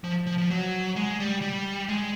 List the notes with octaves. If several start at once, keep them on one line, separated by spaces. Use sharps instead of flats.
F3
F3
F3
F#3
G#3
G3
G3
G#3